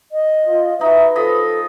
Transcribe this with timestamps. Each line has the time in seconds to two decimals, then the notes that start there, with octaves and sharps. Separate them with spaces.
0.12 D#5
0.47 F4
0.81 D#4 F#4 B4 E5
1.16 F3 A4 D#5 B5